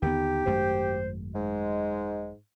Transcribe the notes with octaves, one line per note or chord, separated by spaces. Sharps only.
D#2 D3 B3 D#4 G4
G#1 F#2 A3 C5
G#2 G#3